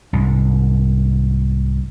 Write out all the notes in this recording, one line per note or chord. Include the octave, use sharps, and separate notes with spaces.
C2 G#2